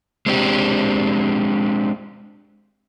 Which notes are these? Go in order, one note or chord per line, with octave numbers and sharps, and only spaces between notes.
G#3 C4 D4 G4